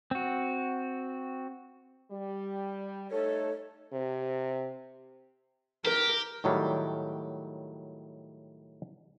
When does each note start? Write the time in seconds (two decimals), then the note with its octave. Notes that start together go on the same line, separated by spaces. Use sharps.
0.11 C4 F#4
2.11 G3
3.11 A3 D#4 A4 C#5
3.92 C3
5.85 G4 A#4
6.44 A2 D#3 F#3 G3